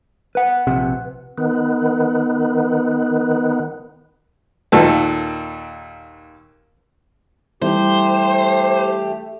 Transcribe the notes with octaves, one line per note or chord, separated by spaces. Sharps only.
B4 F#5
A#1 C3
D#3 B3
D#2 A#2 A4
E3 G3 A3 G4 C5